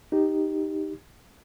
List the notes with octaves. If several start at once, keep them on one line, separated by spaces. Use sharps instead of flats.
D#4 G4